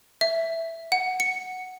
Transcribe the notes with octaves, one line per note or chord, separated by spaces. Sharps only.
E5
F#5
C#7